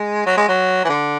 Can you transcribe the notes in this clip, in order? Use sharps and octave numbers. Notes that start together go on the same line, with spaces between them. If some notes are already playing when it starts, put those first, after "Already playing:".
Already playing: G#3
F#3
G#3
F#3
E3
D3